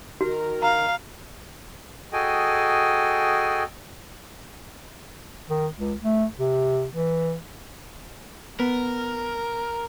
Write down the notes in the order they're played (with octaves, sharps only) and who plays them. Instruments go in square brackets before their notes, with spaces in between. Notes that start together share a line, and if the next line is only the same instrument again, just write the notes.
[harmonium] D#3 A#4 [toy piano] F#4
[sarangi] F5 [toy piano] A#5
[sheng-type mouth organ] F#4 G#4 A4 D#5 G5 G#5
[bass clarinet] D#3
C#2
A3
C3
E3
[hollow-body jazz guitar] B3 [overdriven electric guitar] A#4